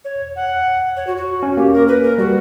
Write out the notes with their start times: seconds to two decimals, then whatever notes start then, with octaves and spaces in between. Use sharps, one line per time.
0.05 C#5
0.36 F#5
0.96 C#5
1.07 F#4
1.17 F#4
1.43 C#4
1.57 A#3 G4
1.73 A#4
1.88 B4
2.03 A#4
2.18 G3 F#4